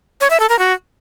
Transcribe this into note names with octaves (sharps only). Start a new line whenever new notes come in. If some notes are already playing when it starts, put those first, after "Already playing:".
C#5
E5
A4
A#4
F#4